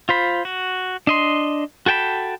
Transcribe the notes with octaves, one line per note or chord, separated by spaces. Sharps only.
F4 C5 B5
F#4
D4 D#5 C6
F#4 A4 G5 A5 B5